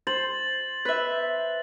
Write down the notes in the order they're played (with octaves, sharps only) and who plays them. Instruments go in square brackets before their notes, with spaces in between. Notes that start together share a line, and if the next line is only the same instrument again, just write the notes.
[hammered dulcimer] C5 [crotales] A6 F#7
[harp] B4 E5